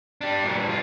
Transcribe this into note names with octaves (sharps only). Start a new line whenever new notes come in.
D4 G4
F#2 A#2
G2
B1 F4